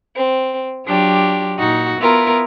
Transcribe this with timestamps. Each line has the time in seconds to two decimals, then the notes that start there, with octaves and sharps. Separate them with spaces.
0.15 C4
0.86 F#3 D4 F4 G4
1.58 A#2 D#4 F#4
1.99 B3 E4 F4 A#4